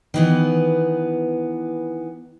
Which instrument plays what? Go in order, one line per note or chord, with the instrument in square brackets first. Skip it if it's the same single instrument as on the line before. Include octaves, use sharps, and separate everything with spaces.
[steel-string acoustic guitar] D#3 E3 B3